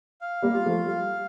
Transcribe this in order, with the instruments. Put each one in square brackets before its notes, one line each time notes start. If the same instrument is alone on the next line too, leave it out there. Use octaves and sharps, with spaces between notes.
[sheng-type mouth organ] F5
[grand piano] G3 A#3
[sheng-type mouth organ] F4
[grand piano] F3 A3
[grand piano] G3 [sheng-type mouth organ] F5